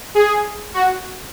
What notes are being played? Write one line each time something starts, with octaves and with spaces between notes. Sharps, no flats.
G#4
F#4